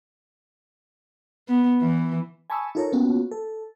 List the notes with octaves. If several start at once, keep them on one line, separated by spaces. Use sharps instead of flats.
B3
E3
G#5 A5 B5 C#6 D#6 E6
D#4 F4 A4 A#4 C#5
A#3 B3 C#4 F4 F#4
A4